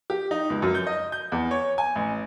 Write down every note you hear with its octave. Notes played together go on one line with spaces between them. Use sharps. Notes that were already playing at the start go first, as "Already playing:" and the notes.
G4
D#4
C#2
F#2
G6
D#5
G6
E2
C#5
G#5
A1